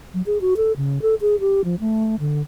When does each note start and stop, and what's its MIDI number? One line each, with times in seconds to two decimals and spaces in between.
0.14 0.22 54
0.26 0.38 68
0.41 0.54 66
0.57 0.72 69
0.77 1.01 49
1.02 1.15 69
1.21 1.39 68
1.40 1.64 67
1.64 1.75 53
1.80 2.16 57
2.20 2.42 50